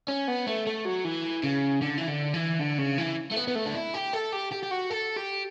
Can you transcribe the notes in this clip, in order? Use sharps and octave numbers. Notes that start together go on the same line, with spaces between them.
C#4
B3
A3
A3
F#3
E3
C#3
D3
E3
D3
E3
D3
C#3
E3
A3
B3
B3
A3
D4
E4
G4
A4
G4
G4
G4
F#4
A4
G4